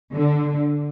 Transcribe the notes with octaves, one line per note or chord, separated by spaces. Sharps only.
D3